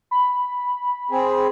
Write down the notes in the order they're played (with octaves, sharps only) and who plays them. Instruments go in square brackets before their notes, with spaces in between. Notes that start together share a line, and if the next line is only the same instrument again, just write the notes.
[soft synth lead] B5
[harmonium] C4 G#4